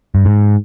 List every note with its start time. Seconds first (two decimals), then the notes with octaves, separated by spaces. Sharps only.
0.15 G2
0.25 G#2